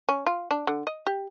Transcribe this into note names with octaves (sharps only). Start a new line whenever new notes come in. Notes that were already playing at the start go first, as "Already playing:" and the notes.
C#4
F4
D4
D3
D#5
G4